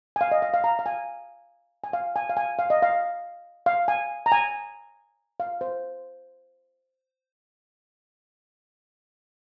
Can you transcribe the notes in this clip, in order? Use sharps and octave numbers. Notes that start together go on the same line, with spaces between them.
G#5
F5
D#5
F5
F5
A#5
F5
G#5
G#5
F5
G#5
F5
G#5
F5
D#5
F5
F5
G#5
A#5
G#5
F5
C5